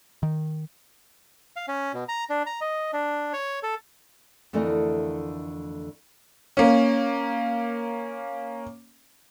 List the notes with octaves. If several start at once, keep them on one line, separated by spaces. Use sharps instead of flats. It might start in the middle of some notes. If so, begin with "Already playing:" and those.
D#3
F5
C#4
B2
A#5
D4
A#5
D#5
D4
C#5
A4
F2 D3 E3 A3 A#4 D#5
A#3 C#4